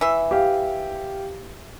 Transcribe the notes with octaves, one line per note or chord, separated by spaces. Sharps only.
E3 E5
G4 F5